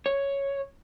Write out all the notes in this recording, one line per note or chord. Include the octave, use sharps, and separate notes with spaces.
C#5